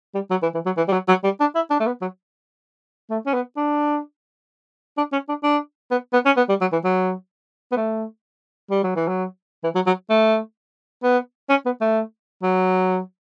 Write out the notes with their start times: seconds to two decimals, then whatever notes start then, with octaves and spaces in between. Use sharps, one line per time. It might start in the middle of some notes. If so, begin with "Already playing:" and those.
0.15 G3
0.30 F#3
0.42 E3
0.54 E3
0.66 F#3
0.77 E3
0.88 G3
0.92 F#3
1.08 F#3
1.24 G3
1.40 D4
1.55 E4
1.70 D4
1.80 A3
1.86 B3
2.01 F#3
3.10 A3
3.26 C#4
3.34 B3
3.57 D4
4.97 D4
5.12 C#4
5.29 D4
5.43 D4
5.91 B3
6.13 B3
6.26 C#4
6.37 B3
6.49 G3
6.61 F#3
6.72 E3
6.84 F#3
7.72 B3
7.76 A3
8.70 G3
8.83 F#3
8.96 E3
9.08 F#3
9.63 E3
9.75 F#3
9.87 F#3
10.10 A3
11.03 B3
11.49 C#4
11.65 B3
11.81 A3
12.43 F#3